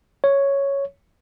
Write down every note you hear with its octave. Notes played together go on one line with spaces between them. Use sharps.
C#5